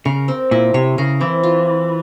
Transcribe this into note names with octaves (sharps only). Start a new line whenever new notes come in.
C#3 A#4
C4
A#2 E4
C3 C#5
C#3 A#4
E3 C4
F4